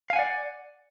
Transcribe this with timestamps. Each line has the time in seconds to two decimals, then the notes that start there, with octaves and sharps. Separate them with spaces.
0.10 F5
0.13 G#5
0.16 F#5
0.19 D5